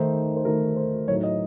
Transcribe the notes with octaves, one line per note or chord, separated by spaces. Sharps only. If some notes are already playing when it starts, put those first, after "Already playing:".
Already playing: D#3 A3 D#4 C5
C5
D#3 A3 D#4 A#4
C5
A2 F#3 A3 D#4 C#5
D#5